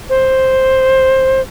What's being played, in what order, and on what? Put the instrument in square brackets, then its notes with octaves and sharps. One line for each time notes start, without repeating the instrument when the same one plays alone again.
[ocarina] C5